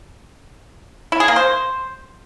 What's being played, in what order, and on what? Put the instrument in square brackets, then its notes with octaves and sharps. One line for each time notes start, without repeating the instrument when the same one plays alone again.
[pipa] E4
G#4
A#3
C5